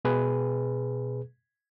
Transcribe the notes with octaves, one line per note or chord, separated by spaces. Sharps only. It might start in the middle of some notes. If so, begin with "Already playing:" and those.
B2 G#4 B4